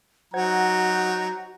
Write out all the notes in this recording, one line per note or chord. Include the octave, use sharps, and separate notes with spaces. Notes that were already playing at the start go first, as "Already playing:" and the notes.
F#3 D#4 F#4 C5 F#5 A#5 G#6